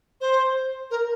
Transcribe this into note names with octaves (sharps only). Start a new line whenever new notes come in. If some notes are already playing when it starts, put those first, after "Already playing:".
C5
A#4